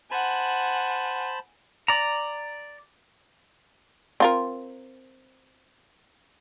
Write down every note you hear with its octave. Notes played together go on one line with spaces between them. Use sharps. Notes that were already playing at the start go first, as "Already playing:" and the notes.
C5 F#5 G#5 A5 B5
D5 A#5
C4 F4 A#4